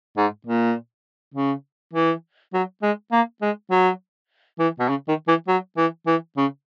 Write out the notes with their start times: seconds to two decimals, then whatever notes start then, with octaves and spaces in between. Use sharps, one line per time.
0.17 G#2
0.47 A#2
1.35 C#3
1.94 E3
2.54 F#3
2.82 G#3
3.12 A#3
3.42 G#3
3.71 F#3
4.59 E3
4.80 B2
4.89 C#3
5.08 D#3
5.28 E3
5.48 F#3
5.77 E3
6.07 E3
6.37 C#3